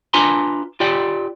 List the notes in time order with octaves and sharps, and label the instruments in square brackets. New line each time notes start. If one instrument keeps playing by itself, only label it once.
[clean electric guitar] D4 F4 B4 G#5 A#5 C6
F4 G4 D5 G5